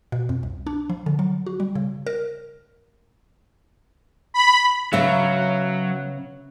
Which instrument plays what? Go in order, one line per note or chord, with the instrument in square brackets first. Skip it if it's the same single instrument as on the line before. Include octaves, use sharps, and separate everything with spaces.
[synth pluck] B2
F2
C2
D4
F3
D3
F#3
F#4
G3
C#3
A#4
[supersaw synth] B5
[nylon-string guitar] C#3 B3 E5 [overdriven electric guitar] F#3